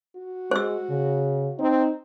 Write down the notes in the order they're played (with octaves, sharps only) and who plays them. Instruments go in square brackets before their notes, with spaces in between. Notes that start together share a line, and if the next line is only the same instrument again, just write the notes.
[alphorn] F#4
[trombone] G#3 [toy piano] C5 E6
[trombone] C#3
[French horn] C4 [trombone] D#4